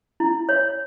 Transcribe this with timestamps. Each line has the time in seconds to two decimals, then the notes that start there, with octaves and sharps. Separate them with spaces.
0.20 E4
0.49 C#5